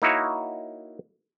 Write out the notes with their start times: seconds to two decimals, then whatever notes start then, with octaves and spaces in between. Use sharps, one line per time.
0.02 A#3 D#4 E4 F#4 C#5